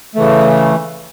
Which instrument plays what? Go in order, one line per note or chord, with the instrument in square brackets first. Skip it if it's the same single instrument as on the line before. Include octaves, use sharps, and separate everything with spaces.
[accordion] C#3 E3 A3